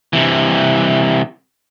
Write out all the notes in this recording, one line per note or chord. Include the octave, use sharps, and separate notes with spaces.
C3 E3